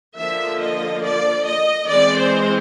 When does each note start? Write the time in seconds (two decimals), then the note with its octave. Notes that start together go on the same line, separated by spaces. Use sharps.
0.17 D3 F3 A#3 E5
0.60 D#5
1.03 D5
1.46 D#5
1.88 E3 G#3 C4 D5
2.18 C5